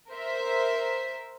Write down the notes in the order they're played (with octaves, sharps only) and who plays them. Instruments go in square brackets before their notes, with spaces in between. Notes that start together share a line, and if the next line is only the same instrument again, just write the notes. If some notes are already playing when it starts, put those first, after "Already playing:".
[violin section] A#4 C5 E5